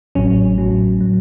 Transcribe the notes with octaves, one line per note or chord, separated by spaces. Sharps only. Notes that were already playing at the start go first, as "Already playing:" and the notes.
A1 A2 F#3 C#4
A1 A2 F#3
A2 F#3